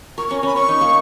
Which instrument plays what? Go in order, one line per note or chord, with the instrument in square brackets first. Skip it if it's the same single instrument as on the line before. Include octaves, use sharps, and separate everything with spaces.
[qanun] A#4 [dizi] C#6
[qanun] C#4 [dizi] C#6
[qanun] C#4 [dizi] B5
[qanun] C#4 [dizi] C#6
[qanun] D#4
A#3